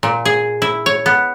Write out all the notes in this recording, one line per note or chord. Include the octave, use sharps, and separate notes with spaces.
A#2
G#4
E4
C#5
B3